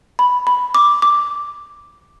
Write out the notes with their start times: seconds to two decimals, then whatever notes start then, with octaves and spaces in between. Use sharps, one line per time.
0.19 B5
0.47 B5
0.75 D6
1.02 D6